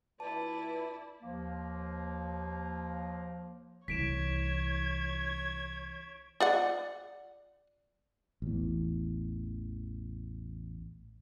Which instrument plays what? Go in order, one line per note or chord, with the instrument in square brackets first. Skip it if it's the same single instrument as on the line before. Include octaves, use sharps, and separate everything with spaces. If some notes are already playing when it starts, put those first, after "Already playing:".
[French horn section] D2 F4 B4 [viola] E4 D5 [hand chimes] A5
[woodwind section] D#2 F3 A#3
[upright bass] C2 E3 [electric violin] C#5 G#6 [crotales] B6 D7 E7
[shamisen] F4 D5 F#5
[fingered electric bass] A1 E2